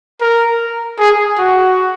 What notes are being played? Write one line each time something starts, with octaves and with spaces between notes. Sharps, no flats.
A#4
G#4
F#4